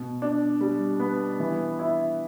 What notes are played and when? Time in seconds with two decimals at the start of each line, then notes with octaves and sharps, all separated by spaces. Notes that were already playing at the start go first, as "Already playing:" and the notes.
Already playing: B2
0.22 D4
0.61 G3
1.00 B3
1.40 E3
1.79 E4